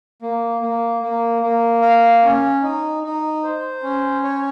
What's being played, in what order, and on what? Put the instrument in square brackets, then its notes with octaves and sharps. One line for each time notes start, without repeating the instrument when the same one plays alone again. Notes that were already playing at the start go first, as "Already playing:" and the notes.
[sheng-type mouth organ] A#3
A#3
A#3
A#3
F5
C#4
D#4
D#4
C5
C#4
C#5